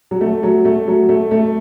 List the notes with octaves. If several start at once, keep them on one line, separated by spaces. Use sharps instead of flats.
F#3
A3
F#3
A3
F#3
A3
A3